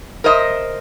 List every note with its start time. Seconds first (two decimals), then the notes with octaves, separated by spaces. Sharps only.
0.24 A#4 C5 D#5 E5